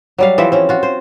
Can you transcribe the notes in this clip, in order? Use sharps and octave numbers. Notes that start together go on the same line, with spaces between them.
F#3 G3 F5
E3 F3 C4 E5
C4 C#4
F4 F#4
C5